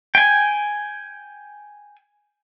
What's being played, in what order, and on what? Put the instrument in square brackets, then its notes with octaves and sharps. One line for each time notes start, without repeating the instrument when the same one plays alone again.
[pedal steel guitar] G5 G#5